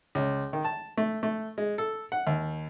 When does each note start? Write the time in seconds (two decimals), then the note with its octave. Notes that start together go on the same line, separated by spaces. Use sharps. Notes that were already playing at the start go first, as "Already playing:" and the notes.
0.15 C#2
0.53 D#3
0.65 A5
0.97 A3
1.23 A3
1.58 G#3
1.78 A4
2.12 F#5
2.27 D#2